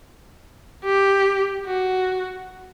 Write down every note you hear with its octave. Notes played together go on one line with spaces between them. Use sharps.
G4
F#4